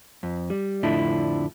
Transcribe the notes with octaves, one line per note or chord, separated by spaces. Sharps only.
F2
G3
F2 A2 D3 F3 D4 E4